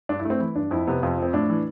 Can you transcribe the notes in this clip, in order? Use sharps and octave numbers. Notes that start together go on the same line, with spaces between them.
G2 D4
E4
A3
C4
E3 E4
G2 D4
F2 E4
C3 B3
F2 F4
F3 C4
A2 D4
E3